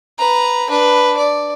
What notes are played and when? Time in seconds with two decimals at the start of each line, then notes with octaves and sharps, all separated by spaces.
0.18 B4 A#5
0.70 D4 B4
1.17 D5